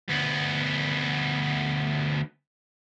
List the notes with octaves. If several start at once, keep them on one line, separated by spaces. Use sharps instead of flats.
D2 B3